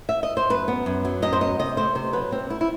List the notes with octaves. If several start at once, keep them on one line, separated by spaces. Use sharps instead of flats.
E5
D#5
C5
F#2 B4
B3
F#2
F#3
F#2 D#5
C5
B3 D#5
C3 D#5
A3 C5
C3 C5
F#3 B4
C3 C4
A3 E4
E4